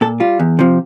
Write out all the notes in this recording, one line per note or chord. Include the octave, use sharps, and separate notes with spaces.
A#2 A4
G3 F4
E2
C3 F3